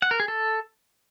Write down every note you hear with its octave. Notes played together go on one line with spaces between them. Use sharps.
F#5
A#4
G#4
A4